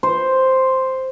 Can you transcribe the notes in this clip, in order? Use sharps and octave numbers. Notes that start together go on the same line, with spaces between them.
C5